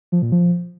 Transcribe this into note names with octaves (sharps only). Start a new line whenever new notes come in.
F3
A#2
F3